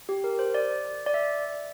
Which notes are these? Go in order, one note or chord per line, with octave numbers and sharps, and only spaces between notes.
G4
A#4
C5
D5
D5
E5